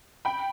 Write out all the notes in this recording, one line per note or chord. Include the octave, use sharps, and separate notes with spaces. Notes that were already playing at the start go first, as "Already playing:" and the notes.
G5 B5